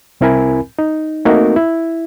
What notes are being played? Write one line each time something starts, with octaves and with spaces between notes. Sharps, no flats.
C2 C4 E4 A#4 G#5 B5
D#4
A3 A#3 C4 D#4 F#4 A#4
E4